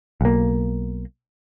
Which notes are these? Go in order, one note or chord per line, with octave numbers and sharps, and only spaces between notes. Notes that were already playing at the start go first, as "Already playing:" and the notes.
B1 A#3